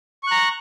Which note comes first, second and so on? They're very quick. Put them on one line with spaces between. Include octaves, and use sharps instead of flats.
C#6 F#6 A#5